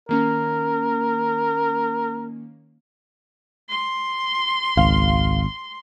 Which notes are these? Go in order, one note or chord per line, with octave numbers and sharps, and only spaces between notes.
D#3 A#3 C#4 A#4
C6
G#1 C#2 F5